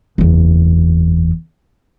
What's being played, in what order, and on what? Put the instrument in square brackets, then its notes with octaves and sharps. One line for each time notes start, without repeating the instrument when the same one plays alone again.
[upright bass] F#1 E2